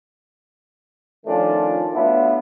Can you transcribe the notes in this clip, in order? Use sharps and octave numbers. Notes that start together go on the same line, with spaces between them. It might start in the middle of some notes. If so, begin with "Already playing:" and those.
D#3 F3 A3 C#4 D4 F4
F#3 A3 B3 D4 E4 F4